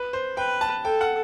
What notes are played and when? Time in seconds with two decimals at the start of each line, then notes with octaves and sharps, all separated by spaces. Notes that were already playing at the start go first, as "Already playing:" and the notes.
Already playing: B4
0.13 C5
0.37 B4 G5
0.61 A5
0.85 A4 G5
1.01 F#5